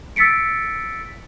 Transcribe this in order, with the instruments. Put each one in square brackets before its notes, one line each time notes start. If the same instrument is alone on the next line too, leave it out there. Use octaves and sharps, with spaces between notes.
[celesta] E6 A6 B6 C#7 D7